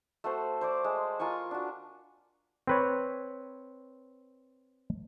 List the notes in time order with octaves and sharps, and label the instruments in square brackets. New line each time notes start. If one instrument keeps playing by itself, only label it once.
[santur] A3 F#4 C5
C5 D5 D6
G#3
F4 A#4 G#5 C#6
D4 F#4
[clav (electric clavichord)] C4 B4 C#5